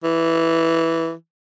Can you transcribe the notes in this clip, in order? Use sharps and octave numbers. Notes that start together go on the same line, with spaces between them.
E3